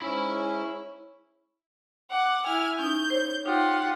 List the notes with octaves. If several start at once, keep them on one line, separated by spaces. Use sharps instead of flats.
G#2 C#4 E4 B5
F#5 D6
E4 G#5 F6
C#4 D#4 G6
C5 C#5
D#4 F4 G4 F#5